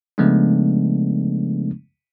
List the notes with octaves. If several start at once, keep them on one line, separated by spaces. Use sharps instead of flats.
C#3 F3 G#3 A3 B3 D4